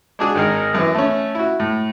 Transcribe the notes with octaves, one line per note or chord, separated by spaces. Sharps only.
G#3 D4 F#4 G#4
G#1 D#3 G#3 A#4
F#2 E3
A3 C#4
E4 F#4
A2